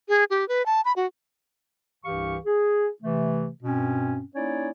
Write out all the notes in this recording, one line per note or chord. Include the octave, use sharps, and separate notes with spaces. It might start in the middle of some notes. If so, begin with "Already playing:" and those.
G#4
G4
B4
A5
B5
F#4
C2 G2 E3 G4 F5 C#6
G#4
C3 E3 A3
G2 B2 C4 C#4
A#3 C#4 D#4 E4 C#5 D5